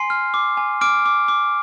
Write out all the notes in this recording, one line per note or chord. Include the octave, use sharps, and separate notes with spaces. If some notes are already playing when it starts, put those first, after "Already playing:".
Already playing: G#5 C6 C7
F6
D6
G#5
D6 F6 D7
D6
D6